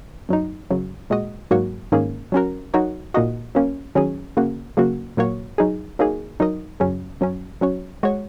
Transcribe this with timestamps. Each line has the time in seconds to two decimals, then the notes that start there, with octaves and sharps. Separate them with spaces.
0.29 F#2 F#3 D#4
0.71 F#2 C#3 F#3
1.10 A#2 G#3 F#4 D#5
1.51 G#2 F#3 A#3 F#4 C#5
1.92 G#2 D#3 A#3 C#4 G#4
2.32 F#3 C#4 F#4 A#4
2.74 F#3 D#4 F#4 A#4 C#5
3.14 A#2 A#3 D#4 F#4 D#5
3.55 F#3 A#3 C#4
3.95 D#3 F#3 C#4 G#4
4.37 C#3 A#3 F#4
4.77 C#3 F#3 A#3 F#4
5.17 A#2 F#3 A#3 F#4 C#5
5.58 F#3 D#4 G#4
5.99 F#3 A#3 D#4 G#4
6.40 F#3 D#4 A#4 D#5
6.80 F#2 C#3 F#3 C#4
7.21 F#2 F#3 C#4
7.61 F#3 C#4 F#4 C#5
8.03 G#3 F#4 C#5